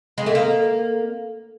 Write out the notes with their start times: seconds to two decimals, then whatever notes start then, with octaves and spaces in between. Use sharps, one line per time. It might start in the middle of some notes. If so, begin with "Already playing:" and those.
0.18 G#3
0.26 A3
0.35 A#3